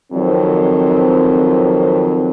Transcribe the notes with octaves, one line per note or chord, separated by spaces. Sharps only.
F2 D#3 F#3 C4